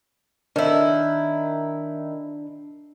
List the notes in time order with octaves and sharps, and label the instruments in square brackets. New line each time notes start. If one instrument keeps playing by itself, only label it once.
[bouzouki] D#3 E4 [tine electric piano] D4